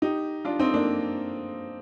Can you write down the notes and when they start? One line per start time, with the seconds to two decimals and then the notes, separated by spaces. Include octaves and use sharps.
0.02 D#4 G4
0.45 D4 F4
0.59 C4 D#4
0.74 A#3 D4